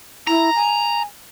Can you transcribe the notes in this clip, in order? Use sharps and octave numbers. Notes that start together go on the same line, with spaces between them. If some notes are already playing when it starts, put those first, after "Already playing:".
E4 A#5
G#5